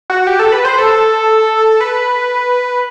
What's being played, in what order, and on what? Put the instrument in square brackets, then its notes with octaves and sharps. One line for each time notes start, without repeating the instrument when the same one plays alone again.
[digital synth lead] F#4
G4
A4
B4
C5
A4
B4